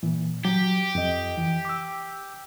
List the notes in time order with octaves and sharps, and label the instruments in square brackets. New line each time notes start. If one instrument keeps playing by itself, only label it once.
[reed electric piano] A#2 E3
[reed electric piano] F#3 [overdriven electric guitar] G4
[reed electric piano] F2 D#5
E3
D6 E6